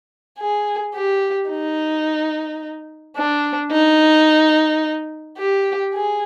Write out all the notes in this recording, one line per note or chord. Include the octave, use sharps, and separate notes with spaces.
G#4
G4
D#4
D4
D#4
G4
G#4